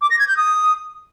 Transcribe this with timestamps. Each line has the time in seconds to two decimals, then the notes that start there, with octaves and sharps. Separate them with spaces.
0.01 D6
0.10 A#6
0.19 G#6
0.28 G6
0.37 D#6